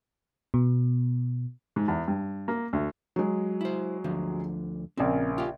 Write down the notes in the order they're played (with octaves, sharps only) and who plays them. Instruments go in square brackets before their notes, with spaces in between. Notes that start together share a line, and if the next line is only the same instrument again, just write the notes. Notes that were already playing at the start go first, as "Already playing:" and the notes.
[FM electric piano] B2
[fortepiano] G#2
E2
G2
A#3
D2
[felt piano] F#3 G#3
[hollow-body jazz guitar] E4 C5
D2 D3 F3
[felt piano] A#1 C#3 A#4 [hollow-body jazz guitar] C4
[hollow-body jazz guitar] F4 G4